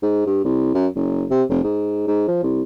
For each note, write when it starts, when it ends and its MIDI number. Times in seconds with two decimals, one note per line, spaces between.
0.03 0.25 44
0.26 0.41 43
0.44 0.72 36
0.74 0.87 42
0.95 1.25 30
1.31 1.43 48
1.50 1.59 29
1.64 2.06 44
2.07 2.26 44
2.28 2.39 53
2.43 2.62 36